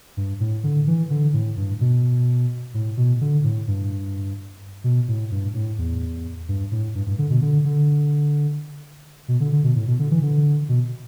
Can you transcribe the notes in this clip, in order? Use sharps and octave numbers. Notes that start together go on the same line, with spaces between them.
G2
A2
D3
E3
D3
A2
G2
B2
A2
B2
D3
A2
G2
B2
A2
G2
A2
E2
G2
A2
G2
G2
D3
B2
D3
D3
B2
D3
D3
B2
A2
B2
D3
E3
D3
B2